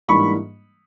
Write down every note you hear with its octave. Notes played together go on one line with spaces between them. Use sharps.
G#2 E3 G3 A#3 D4 B5 C#6